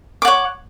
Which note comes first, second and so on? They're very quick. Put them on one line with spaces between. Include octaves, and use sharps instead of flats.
D6 F#5 C#5